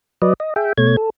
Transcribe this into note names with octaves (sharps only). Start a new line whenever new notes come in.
F#3 B4 D5 D#5
D#5
G#4 E5 G5
B2 A3 C#5 G#6
A4